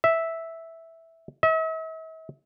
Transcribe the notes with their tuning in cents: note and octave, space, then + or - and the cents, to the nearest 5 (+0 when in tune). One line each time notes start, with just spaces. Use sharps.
E5 -5
E5 -45